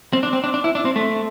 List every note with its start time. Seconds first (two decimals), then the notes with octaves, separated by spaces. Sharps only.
0.13 C4
0.23 D4
0.33 C4
0.44 D4
0.54 D4
0.64 E4
0.75 D4
0.85 C4
0.96 A3